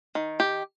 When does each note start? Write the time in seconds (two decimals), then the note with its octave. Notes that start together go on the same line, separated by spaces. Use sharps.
0.15 D#3
0.40 G4